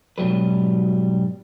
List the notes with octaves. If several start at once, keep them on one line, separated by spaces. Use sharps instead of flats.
G#2 B2 F#3 G3 B4